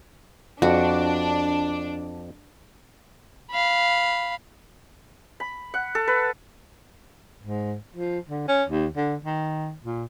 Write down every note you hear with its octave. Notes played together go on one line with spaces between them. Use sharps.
F2 D4 F#4
F5 B5
B5
F#5
A4
B4
G#2
F3
D3
C#4
D#2
D3
D#3
A#2